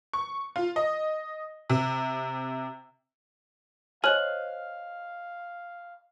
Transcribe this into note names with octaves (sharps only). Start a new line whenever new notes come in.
C#6
F4
D#5
C3
C5 C#5 D#5 F5 G#5 F6 F#6 F#7